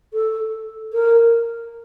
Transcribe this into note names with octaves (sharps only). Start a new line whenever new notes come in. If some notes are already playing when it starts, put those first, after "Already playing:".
A4
A#4